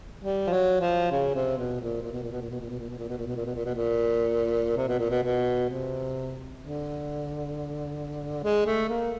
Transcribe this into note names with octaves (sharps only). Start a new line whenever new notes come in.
G3
F3
F#3
F3
C#3
C3
B2
A#2
A#2
B2
A#2
B2
A#2
B2
A#2
B2
A#2
B2
A#2
B2
A#2
B2
A#2
B2
A#2
B2
A#2
C3
B2
A#2
B2
B2
C3
D3
G#3
A3
A#3